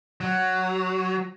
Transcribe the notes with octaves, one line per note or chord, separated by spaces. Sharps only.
F#3